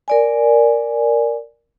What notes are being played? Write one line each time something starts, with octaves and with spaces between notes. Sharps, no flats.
A#4 D5 G#5